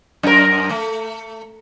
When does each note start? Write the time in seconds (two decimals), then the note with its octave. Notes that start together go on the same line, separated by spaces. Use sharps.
0.23 F#2 A#4
0.70 A3